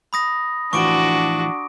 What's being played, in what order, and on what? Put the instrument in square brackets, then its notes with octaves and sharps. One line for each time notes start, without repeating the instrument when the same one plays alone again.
[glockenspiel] B5 D#6 A#6
[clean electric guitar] A2 E3 F3 [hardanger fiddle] D4 F#4 [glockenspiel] C#6 D6 D7